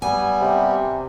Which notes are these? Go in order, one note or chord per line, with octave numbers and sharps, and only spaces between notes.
G3 B3 G#5
C3